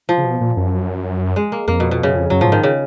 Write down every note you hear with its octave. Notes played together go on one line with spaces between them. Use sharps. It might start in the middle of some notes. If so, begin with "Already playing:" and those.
F3
C#3
B2
A#2
F#2
G#3
A#3
F2 A#3
B2
B2
F#2 C#3
F2
F#2 F#3
A#2 F3
G#2 D#3
C#3